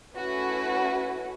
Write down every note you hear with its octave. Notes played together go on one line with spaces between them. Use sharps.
A3 C#4 E4 F#4 B4